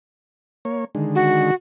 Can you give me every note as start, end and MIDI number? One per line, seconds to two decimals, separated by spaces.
0.65 0.85 58
0.65 0.85 73
0.95 1.51 50
0.95 1.51 51
0.95 1.51 56
1.15 1.54 66